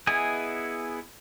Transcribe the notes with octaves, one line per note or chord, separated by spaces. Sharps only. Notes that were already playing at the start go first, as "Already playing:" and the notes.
B3 E4 G#4 D#5 G#5